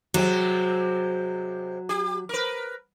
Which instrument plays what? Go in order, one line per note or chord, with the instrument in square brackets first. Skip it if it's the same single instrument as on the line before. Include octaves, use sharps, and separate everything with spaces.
[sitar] C3 G#3 C4 [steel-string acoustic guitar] F#3
[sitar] G4
A#4 B4